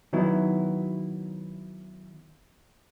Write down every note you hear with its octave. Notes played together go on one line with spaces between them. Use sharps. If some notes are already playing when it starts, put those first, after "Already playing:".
D#3 F#3 B3 E4